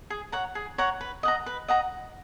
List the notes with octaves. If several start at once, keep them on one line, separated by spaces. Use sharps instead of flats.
G#4
C#5 F#5 A#5
G#4
C#5 F#5 A#5
B4
D#5 F#5 A#5
B4
D#5 F#5 A#5